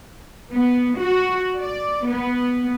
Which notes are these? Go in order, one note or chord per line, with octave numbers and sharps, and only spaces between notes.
B3
F#4
D5
B3